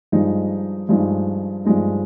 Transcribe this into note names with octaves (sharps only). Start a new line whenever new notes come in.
G2 F3 G#3 D#4
G2 F3 G#3 D#4
G2 F3 G#3 D#4